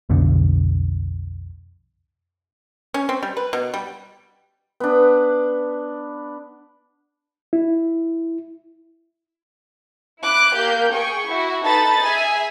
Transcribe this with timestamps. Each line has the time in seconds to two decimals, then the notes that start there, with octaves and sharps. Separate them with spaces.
0.09 B1 F2 B2 D3
2.94 C#4
3.09 C4
3.23 G3
3.37 B4
3.53 B2
3.74 G3
4.80 B3 D4
7.53 E4
10.22 E4 D6 F#6
10.55 A#3 G4 G6
10.94 G#4 G5 C#6
11.29 E4 F#4
11.64 D#4 A4 B4 A5 B5 A6
12.04 G#4 E5 G#5